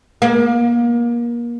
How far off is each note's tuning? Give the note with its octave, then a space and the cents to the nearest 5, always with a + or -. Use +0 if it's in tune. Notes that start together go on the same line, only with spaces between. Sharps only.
A#3 +30